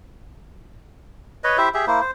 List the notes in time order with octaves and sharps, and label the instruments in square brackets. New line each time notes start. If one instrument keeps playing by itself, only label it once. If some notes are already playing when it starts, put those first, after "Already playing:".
[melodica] B4 C#5 D#5
E4 G4 C5 E5
G4 G#4 E5
A#3 E4 C5
C5